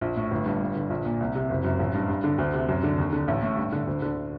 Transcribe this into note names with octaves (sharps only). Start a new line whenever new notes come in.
A#1
A2
G1
G2
G2
D3
A#1
A#2
C2
C3
F#1
F#2
A1
G2
G2
D3
D2
C3
F#2
D3
D#2
D3
A1
A2
G2
D3
D2
D3